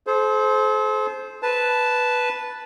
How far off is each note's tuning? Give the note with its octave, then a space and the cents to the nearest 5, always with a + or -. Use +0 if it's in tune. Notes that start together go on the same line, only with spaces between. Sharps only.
A4 -45 C5 +0
B4 +0 A5 -5